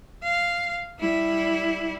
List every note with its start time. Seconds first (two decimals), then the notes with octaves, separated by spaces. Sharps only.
0.23 F5
1.00 G3 E4